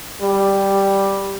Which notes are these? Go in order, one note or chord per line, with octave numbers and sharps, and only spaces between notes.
G3